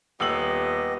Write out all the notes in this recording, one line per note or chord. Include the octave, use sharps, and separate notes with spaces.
D#1 B3 G4 D#5 E6 F#7